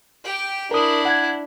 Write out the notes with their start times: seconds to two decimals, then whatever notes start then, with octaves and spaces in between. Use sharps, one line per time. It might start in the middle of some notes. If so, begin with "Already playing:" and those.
0.24 G4 G5
0.71 D4 E4 A#4 D#6
1.05 F#5 G#6